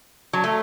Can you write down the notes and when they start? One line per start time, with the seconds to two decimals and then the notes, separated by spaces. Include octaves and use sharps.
0.33 F#3
0.44 A3